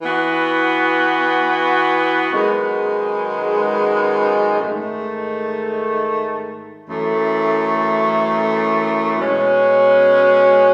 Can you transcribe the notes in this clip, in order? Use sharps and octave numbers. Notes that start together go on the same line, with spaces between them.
E3 B3 F#4
F#2 D#3 G#3 B3
G#2 D#3 A3
F#2 E3 A3
B2 G#3 C#4